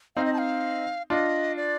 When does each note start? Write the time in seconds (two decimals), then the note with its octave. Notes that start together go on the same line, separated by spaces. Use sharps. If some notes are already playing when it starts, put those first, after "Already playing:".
0.16 C4 D#4 F5
0.25 D#5
0.33 A5
0.38 F5
1.10 D4 F4 D#5
1.57 D5